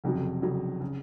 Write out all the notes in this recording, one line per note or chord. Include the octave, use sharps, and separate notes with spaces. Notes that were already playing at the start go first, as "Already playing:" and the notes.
F1 F2 C#3 F#3
F1 F2 C#3 F#3
C#3